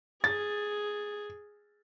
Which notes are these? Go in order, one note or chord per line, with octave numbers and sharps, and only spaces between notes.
G#4 A6